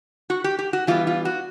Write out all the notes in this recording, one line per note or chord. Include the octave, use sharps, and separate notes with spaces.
F#4
G4
G4
F#4
E3 G3 B3 F4
F4
F#4